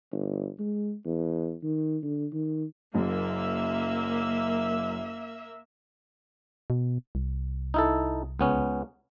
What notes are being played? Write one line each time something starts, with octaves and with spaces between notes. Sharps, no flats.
G1
G#3
E2
D#3
D3
D#3
F#1 F#2 A#3 E5
B2
C2
D#4 E4 A4
C#2 B3 C#4